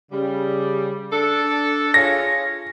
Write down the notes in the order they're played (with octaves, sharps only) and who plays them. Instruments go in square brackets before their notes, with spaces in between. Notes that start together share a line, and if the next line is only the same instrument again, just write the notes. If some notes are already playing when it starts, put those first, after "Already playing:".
[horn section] C#3 G3
D4 A4
[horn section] F4 G#4 C#5 [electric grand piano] A#6